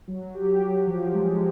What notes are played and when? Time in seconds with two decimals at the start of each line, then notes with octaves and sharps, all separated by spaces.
0.08 F#3
0.34 G4
0.61 F#3
0.87 F3
1.14 G#3